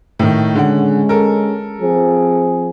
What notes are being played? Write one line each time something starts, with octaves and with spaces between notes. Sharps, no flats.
A2 D#3
D3 G#3 C#4 F#5
A4 A#4
F3 C4 G#4